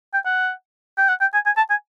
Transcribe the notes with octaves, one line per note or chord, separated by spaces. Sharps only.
G5
F#5
G5
F#5
G5
G#5
G#5
A5
G#5